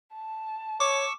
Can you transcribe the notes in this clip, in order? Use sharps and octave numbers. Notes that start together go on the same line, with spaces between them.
A5
C#5 C#6 D6 E6